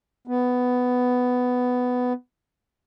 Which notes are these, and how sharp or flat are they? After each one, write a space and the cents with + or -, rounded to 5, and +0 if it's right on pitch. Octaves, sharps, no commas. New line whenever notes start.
B3 +10